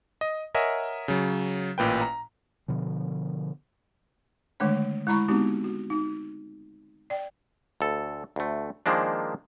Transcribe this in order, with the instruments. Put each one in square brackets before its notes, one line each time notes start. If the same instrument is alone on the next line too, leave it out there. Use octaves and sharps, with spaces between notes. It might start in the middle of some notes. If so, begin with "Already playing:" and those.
[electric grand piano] D#5
A#4 C#5 D#5 E5 F#5 G#5
C#3 F#3
A1 A#2 B4 G5
A#5
[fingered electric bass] B2 D3 F3
[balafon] D3 D#3 G#3 A3 D4 C#5
G#3 E4 A#5 B5 C#6
G#3 B3 C4 D#4 F#4 G4
F#4
D#4
D5 G5
[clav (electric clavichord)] D2 A4
D2 A3
D#3 F3 G#3 A#3 D4